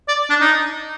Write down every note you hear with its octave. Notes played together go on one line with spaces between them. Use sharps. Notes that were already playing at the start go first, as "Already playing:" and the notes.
D5
D4
D#4